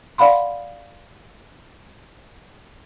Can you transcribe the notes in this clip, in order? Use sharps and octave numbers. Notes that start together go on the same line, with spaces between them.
D5 F5 F#5 B5 C6